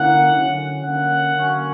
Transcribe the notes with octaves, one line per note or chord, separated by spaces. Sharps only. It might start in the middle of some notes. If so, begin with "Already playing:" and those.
Already playing: D3 A#3 C#4 E4 F#5
D3 F#3 C#4
D3 A#3 C#4 F#5
D3 F#3 A#3 C#4